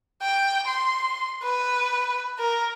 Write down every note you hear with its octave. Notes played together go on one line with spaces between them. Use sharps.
G5
C6
B4
A#4